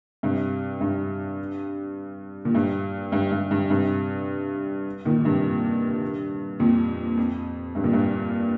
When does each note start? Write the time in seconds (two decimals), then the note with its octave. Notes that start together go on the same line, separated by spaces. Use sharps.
0.23 G2 C3
0.81 G2
2.45 A#2
2.55 G2
3.12 G2
3.32 G2
3.51 G2
3.70 G2 C3
5.05 A#2 D#3
5.25 G2 C3
6.59 F2 A#2
7.17 F2
7.75 G2
7.84 A#2
7.93 G2